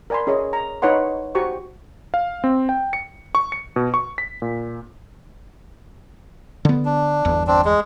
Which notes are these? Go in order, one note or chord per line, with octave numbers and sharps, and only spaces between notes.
A#4 D5 G#5 B5 C6
C#4 G#4 C#5 D#5
A#5
D#4 B4 C#5 D#5 F#5 C6
F#4 G4 C5 C#6
F5
C4
G5
C#7
C#6
C#7
B2
C#6
B6
A#2
D3 B3
D4
G1 E2
C4 D4
G#3